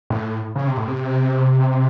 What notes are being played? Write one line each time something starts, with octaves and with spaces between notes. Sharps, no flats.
A2
C#3
C3
A2
C3